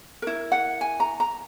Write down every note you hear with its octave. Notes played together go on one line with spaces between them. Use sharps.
E4 A#4
F#5
G#5
A#5
A#5